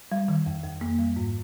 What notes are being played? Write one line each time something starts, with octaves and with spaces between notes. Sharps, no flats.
G3
D#3
F2
F2
A#3
G3
G#2